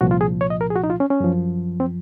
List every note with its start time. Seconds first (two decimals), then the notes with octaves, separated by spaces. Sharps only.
0.01 C2 A#2 F3 F#4
0.11 F4
0.21 G#4
0.41 C#5
0.50 D#5
0.61 A#4
0.70 G#4
0.76 F#4
0.84 D#4
0.90 F4
1.00 C#4
1.10 C#4
1.20 F#2 F3
1.80 C4